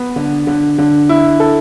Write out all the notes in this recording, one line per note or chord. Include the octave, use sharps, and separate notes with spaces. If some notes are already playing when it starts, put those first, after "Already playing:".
Already playing: B3
D3
D3
D3
E4
A4